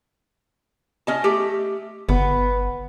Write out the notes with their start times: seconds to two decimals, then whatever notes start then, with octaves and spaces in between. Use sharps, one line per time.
1.07 C#4 D#5 A5
1.24 A3 G4
2.09 G1 B3